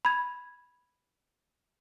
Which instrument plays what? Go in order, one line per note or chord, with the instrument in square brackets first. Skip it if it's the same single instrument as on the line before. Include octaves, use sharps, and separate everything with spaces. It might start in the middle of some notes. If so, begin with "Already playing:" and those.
[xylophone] B5 G#6